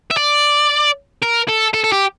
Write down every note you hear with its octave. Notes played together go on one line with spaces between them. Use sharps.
E5
D5
A#4
A4
A4
A4
G4